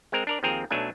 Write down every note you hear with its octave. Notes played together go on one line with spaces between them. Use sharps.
G#3 C4 A#4
D4 A#4 D5
D#2 F3 C4 G#4 A#4
B1 F#3 A3 D4 G#5